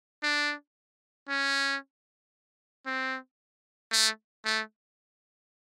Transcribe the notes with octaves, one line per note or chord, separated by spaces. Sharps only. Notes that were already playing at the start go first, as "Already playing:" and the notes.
D4
C#4
C4
A3
A3